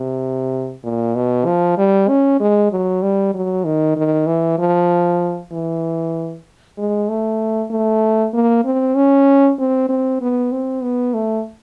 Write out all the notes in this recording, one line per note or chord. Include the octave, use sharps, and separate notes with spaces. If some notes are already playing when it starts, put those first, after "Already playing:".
Already playing: C3
A#2
B2
F3
G3
C#4
G#3
F#3
G3
F#3
D#3
D#3
E3
F3
E3
G#3
A3
A3
A#3
C4
C#4
C4
C4
B3
C4
B3
A3